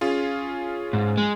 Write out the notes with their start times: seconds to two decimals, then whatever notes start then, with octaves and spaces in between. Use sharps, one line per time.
0.01 C#4 F4 G#4
0.93 G#2
1.18 G#3